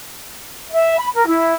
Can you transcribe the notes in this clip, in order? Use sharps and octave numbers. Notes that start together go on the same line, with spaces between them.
E5
B5
A#4
E4